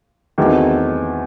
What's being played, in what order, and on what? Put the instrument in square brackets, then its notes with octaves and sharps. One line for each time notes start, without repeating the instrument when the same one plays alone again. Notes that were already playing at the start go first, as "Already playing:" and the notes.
[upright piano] E2 D#3 F#3 A3 C4